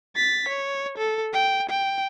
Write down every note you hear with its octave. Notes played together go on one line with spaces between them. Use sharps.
A6 B6
C#5
A4
G5
G5